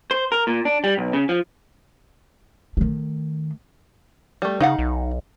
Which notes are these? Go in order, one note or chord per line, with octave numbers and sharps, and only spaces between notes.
C5
A#4
A#2
D4
G3
B1
C#3
F3
D#3 A3
G3 A3
C#3 D#4 F5 F#5
B1